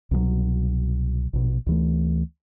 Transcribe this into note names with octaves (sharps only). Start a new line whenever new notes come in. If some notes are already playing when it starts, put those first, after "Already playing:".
C2 B2 D#3 F#3
A#1 B2
D2 E3 A3